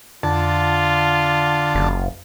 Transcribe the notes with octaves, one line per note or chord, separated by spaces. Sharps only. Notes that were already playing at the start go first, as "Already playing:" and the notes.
F2 D3 F4 A5
F#1